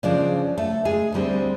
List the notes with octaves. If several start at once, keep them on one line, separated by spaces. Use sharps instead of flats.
C#3 F3 G#3 D4 D5
A3 A4
G#3 G#4
D2 D3 G3 C4